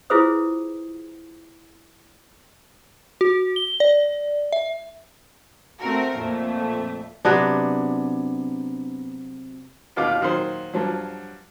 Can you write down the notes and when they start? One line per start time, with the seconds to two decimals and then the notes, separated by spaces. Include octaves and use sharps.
0.10 E4 F4 G#4 B4 C5 D#6
3.21 F#4
3.56 G7
3.80 D5
4.52 E5
5.80 A3 C4 F#4 A#4
6.16 F2 A#2 A3
7.25 C3 F#3 B3 D4
9.96 D#2 B2 F4 F5 D6
10.21 A#2 D#3 F#3 C5
10.74 G2 F3 F#3